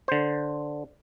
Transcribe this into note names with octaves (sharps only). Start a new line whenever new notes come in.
D3 C5